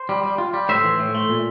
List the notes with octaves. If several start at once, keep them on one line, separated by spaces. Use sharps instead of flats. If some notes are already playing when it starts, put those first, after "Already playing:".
Already playing: C5
G3
G3
F4
G3
A2 C5 E5
E3
A2
A3
A#2